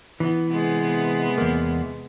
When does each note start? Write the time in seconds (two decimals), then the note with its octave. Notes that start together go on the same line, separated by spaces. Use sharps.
0.20 E3 B3
0.50 C3 G#3 B3
1.38 E2 A#3